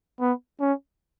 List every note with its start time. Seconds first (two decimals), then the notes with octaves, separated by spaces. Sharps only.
0.20 B3
0.61 C#4